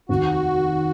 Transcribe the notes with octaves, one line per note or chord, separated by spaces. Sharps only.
F1 D#2 D#3 F#4